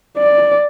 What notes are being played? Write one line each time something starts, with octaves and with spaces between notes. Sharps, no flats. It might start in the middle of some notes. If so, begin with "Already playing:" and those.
D5